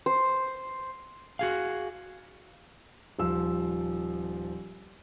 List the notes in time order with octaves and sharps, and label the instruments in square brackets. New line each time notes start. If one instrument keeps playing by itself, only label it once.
[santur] C5
[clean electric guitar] F#4 G#4 F5
[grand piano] D#1 F3 E6